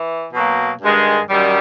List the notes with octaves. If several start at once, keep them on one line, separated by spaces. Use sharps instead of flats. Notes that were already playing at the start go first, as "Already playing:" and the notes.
Already playing: E3
B2 F#3 A#3
G2 D#3 G#3
F#2 D#3 G3